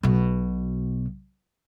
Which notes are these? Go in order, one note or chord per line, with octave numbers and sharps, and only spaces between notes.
B1 B2